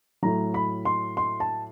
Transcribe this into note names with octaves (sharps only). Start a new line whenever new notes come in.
A2 F#3 A#5
B5
C6
C6
A5